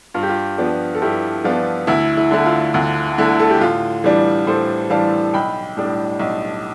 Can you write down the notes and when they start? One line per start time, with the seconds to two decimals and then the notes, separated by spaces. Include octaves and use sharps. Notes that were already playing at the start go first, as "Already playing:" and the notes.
0.14 G2 F4
0.23 G4
0.29 F4
0.58 F3 B3 D4
0.95 A4
1.02 G2 E4 G4
1.44 F3 B3 D4 F4
1.87 D2 E4
2.17 E4
2.31 D3 A3 E4
2.46 F4
2.74 D2
3.18 D3 A3 E4
3.39 A4
3.50 G4
3.61 A2 F4
4.04 E3 G3 D4
4.47 A2 A4 C5
4.90 E3 G3 D4 F5 A5
5.34 B1 G5 B5
5.77 A2 G3 D4
6.19 B1